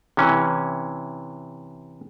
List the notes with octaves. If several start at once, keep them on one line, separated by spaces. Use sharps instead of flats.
C3 E3 C#4